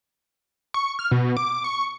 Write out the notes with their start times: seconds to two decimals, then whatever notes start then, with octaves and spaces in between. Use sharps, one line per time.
0.74 C#6
0.99 F6
1.11 B2
1.37 D6
1.64 C#6